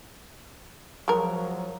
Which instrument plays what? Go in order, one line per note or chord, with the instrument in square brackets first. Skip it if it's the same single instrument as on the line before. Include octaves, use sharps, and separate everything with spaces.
[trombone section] F3 F#3 [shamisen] G#3 A#4